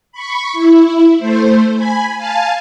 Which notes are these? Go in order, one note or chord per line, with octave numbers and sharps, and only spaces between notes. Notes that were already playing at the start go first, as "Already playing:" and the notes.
B5 C#6
E4
A3 C5
G#5 B5
F5 G#5 A5